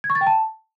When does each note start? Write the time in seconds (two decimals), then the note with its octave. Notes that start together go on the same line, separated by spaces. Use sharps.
0.04 G#6
0.10 C#6
0.15 A6
0.21 G5
0.27 A5